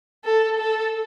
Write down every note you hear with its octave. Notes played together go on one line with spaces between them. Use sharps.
A4
A4